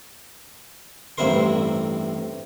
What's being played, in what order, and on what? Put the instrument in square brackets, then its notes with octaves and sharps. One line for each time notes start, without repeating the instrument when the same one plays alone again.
[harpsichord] A1 G2 C4 E4 A#4 C6